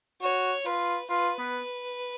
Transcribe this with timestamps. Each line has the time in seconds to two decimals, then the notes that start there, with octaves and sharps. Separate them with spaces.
0.21 F#4 C#5
0.65 F4 B4
1.10 F4 B4
1.39 B3